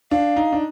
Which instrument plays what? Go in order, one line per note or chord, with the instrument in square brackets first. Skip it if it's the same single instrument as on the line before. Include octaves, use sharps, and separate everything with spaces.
[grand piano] D4 [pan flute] F5
[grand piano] D#4
D4